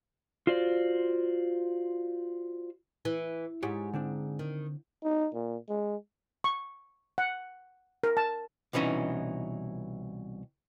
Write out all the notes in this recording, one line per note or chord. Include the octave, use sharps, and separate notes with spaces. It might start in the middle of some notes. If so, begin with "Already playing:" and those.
F4 F#4 C5 D5
E3
G#2 G4 C#5
D3 C4 D4
D#3
D#4
A#2
G#3
C#6
F#5
A#4
A5
C2 B2 E3 C#4 D#4